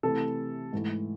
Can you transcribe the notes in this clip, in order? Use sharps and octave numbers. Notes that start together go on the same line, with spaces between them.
C3 E3 A3 A4
G#2 E3 A3